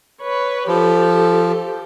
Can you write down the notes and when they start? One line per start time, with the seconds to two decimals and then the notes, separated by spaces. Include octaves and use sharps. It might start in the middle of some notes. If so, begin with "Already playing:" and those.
0.21 B4 C#5
0.68 F3 G4 A4